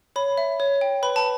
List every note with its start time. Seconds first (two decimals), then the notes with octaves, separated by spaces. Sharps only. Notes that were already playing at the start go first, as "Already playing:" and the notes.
0.16 C#5 B5
0.38 E5
0.60 C#5
0.81 G5
1.03 B4 B5
1.16 A5